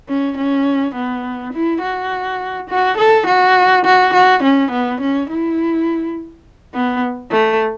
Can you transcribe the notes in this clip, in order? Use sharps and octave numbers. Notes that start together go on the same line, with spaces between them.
C#4
C#4
B3
E4
F#4
F#4
A4
F#4
F#4
F#4
C#4
B3
C#4
E4
B3
A3